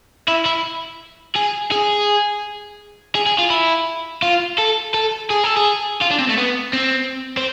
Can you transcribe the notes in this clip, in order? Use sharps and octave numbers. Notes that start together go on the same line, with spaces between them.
E4
E4
G#4
G#4
G#4
G#4
F4
E4
F4
A4
A4
G#4
A4
G#4
F4
D4
C4
A3
B3
C4
C4